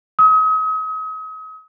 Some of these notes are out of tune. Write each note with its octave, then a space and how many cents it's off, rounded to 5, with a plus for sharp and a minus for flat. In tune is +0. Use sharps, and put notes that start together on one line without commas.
D#6 +40